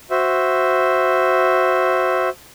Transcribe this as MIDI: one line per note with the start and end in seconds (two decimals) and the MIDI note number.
0.11 2.29 66
0.11 2.29 72
0.11 2.29 76